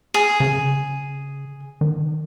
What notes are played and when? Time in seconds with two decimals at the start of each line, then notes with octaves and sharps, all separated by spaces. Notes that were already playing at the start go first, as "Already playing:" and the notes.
0.14 G#4
0.40 C#3
1.81 D#3